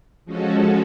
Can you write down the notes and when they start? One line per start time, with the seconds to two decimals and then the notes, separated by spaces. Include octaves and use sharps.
0.25 F3 G#3 C#4 F#4 A4